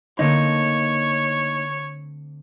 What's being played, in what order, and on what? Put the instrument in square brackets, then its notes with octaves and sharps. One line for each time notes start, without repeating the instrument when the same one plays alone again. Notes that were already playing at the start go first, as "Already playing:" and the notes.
[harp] D3 A3 C4 [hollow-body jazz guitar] A#3 D#4 [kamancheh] C#5